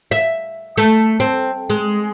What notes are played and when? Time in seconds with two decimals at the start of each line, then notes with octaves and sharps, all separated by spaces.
0.11 E5
0.77 A3
1.20 C4
1.70 G#3